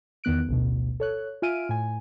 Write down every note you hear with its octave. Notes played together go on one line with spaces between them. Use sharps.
E2 D#3 B3 F#6 D7
A1 D2 B2
A4 C#5 F#6
F4 E5 G#5 F6 D7 D#7
A2 G#5